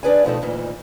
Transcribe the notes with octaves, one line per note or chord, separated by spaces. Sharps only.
D#3 D4 G#4 B4 D5 G#5
B2 D#3 F3 A3 D#4 A4
D2 A#2 E3 D#4